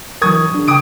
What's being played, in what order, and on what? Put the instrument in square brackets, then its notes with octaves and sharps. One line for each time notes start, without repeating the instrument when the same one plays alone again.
[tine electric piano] E3 F#3 A#4 [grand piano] C#6 D#6 G#6
[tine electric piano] D4 G#4
[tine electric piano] C#3 G5 [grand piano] D6 D#6 D7